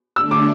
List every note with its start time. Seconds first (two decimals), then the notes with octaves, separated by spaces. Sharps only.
0.16 D3 A3 D4 E6
0.31 D6